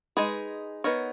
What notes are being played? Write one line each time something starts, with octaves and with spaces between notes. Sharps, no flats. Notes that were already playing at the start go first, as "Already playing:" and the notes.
G#3 D#4 G#4 B4
B3 D#4 A#4 C#5